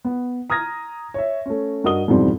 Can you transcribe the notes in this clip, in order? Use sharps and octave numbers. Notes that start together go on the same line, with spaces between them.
B3
A#5 D#6 F6 G#6 A#6
C#5 E5
A3 C#4
G2 F#4 A#4 D#5 D#6 G7
F2 G#2 B2 E3 G3 C4